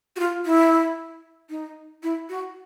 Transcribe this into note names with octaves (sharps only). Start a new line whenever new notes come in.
F#4
F4
E4
D#4
E4
F#4